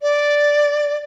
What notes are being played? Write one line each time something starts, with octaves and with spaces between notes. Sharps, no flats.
D5